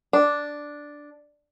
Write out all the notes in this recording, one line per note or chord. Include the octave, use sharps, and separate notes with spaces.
D4